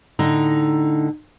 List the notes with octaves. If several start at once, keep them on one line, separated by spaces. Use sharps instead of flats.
A2 D3 D#4 A#5